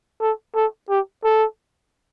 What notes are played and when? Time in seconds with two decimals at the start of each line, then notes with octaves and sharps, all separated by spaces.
0.21 A4
0.55 A4
0.89 G4
1.24 A4